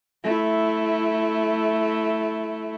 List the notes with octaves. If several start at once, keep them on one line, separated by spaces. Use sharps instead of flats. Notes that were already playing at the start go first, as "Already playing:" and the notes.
A3 E4